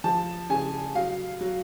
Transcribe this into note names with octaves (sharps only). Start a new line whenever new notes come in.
F3 A5
C#3 G#5
F#3 F5
F#3